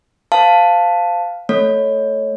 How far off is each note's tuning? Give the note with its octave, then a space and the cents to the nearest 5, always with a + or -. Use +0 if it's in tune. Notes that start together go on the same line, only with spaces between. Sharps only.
C5 -25 F5 +0 A5 +0
A3 +0 C#5 +0